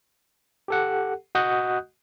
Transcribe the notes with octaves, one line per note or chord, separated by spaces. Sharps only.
G4 A4 F#5
F#4 D#5 F#5 D#6 F#6 G6